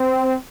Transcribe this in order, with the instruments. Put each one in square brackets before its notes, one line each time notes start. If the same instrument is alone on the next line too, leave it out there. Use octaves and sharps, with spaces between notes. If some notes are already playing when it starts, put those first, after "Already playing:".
Already playing: [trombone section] C4